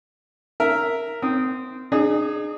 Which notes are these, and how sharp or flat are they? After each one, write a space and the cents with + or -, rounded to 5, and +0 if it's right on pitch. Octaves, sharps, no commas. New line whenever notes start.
A#4 +0 E5 +0
C4 -20 D#6 +0
D#4 -45 G#4 +0